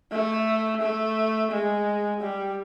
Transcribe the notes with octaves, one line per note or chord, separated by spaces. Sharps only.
A3
A3
G#3
G3